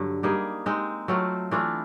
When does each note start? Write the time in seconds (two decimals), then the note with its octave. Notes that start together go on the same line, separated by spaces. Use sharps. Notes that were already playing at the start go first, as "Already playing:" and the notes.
Already playing: G2 D3 F#3
0.23 G3 A#3 D#4 G#4
0.66 G#3 C4 D#4
1.08 F#3 A3 C4 F4
1.51 E3 A3 D4 F4